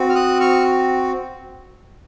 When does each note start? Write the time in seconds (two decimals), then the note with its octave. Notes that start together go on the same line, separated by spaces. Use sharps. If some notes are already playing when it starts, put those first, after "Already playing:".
Already playing: C4 F#4
0.10 F6
0.15 D#6 F#6
0.40 C#6 F6